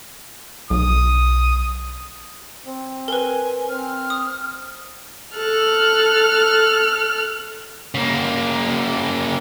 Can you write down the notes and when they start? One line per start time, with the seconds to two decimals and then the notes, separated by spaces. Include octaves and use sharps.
0.70 B1 D#6
2.67 C4
3.08 A#4 B4 G#5
3.69 C4 F6
4.10 D#6
5.36 A4 F6 F#6
7.94 C#3 A#3